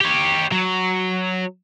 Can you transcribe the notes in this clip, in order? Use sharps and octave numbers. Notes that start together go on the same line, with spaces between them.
G4 C#5
F#3